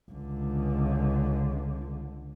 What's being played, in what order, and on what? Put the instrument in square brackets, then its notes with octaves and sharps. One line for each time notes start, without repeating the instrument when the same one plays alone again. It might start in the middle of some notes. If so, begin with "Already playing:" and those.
[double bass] C#2 D3